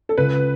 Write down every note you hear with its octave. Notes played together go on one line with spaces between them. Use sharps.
A4
C#2 B4